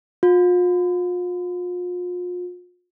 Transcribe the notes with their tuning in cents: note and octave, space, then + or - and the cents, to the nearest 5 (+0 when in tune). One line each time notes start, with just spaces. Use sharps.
F4 +40